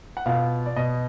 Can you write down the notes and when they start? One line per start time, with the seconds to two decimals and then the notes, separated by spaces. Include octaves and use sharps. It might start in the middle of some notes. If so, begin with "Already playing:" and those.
0.17 F#5
0.26 B2 F4 F5
0.66 D5
0.76 B2 D#5